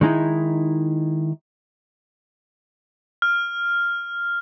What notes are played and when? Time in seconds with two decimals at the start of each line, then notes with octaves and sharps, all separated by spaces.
0.01 D#3 G#3 D#4 E4
3.22 F6